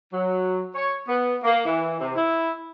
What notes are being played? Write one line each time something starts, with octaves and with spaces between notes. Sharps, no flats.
F#3
C#5
B3
A#3
E3
C3
E4